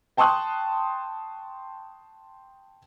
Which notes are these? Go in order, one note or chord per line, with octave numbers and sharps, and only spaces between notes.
G5 A5 C6 C#6 D#6 F#6